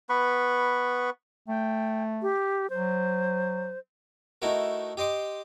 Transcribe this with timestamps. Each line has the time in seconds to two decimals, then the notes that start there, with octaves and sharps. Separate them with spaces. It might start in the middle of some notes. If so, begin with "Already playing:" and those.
0.09 B3 B4 B5 C#6
1.48 A3 G5
2.22 G4
2.70 F#3 C5
4.42 A3 D#4 E4 F#4 A#4
4.97 G4 D#5 C6 D6